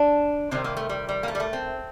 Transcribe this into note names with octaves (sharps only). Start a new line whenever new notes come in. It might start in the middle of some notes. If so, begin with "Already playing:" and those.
Already playing: D4
C3 D#3 G3 C4
A#3
A3
G3
G3
A#3
A3
G3
A3
C4